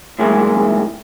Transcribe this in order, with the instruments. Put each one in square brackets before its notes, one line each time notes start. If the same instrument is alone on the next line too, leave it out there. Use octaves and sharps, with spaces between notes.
[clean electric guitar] A2 D#3 E3 F#3 G#3 A#3